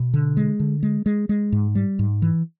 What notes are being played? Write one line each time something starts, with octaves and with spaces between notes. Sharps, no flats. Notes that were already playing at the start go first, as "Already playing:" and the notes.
Already playing: B2
D3
G#3
D3
G#3
G#3
G#3
G#2
G3
G#2
E3